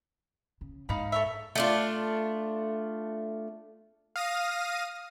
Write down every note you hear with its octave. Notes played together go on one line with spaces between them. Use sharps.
C#3
G#2 D#4 F5 B5
A4 C#5 E5
A3 D4 F4
F5 D#6 A#6 D#7